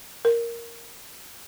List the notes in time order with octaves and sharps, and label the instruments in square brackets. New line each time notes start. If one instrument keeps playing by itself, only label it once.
[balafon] A#4